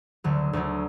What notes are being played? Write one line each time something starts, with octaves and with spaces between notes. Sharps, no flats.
D2 D3 F#3
D2 D3 F#3